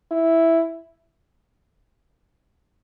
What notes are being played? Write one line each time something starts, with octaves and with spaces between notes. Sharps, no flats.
E4